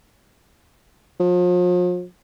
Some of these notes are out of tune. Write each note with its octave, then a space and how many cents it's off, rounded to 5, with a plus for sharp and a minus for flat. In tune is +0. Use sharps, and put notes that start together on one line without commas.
F3 +40